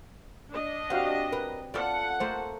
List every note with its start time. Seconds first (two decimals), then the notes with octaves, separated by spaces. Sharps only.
0.51 D4 D#5
0.90 C4 F#4 G4 F5 F#5
1.32 A#4 B4
1.74 F4 A4 D5 F#5
2.20 A3 A#3 C5